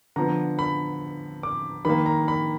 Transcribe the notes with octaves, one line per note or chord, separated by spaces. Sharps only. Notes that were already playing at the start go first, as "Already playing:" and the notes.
D3 F3 B3 A#5
B5
D6
D#3 A#3 B5
A#5
B5